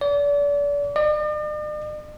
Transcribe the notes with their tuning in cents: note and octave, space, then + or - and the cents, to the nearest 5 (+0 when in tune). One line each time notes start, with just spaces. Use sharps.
D5 -35
D5 +45